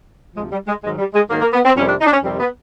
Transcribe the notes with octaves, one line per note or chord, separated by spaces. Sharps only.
D2 C3 F3 G#3
G3
G#3
G#2 D#3 F#3 G#3
G3
G#3
G#2 D#3 F#3 A#3
A#3
B3
C4
F2 C3 D#3 G3 C#4
D4
D#4
D4
C#4
F2 C3 D#3 G3 C4
B3